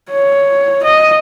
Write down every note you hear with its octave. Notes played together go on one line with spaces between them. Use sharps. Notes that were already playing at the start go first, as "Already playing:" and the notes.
C#5
D#5